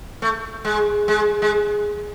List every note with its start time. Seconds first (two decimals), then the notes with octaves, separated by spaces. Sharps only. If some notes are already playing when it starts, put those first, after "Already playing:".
0.22 A3
0.65 G#3
1.08 G#3
1.42 G#3